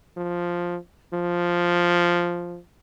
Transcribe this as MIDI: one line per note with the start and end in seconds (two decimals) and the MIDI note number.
0.17 0.77 53
1.13 2.58 53